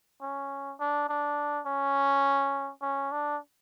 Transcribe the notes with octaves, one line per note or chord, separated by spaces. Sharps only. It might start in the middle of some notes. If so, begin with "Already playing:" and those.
C#4
D4
D4
C#4
C#4
D4